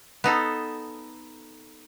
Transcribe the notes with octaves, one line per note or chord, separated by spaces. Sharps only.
B3 D#4 A4